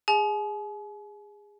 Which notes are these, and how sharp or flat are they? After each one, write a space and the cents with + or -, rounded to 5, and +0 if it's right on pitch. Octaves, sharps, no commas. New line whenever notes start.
G#4 -20 G#5 +40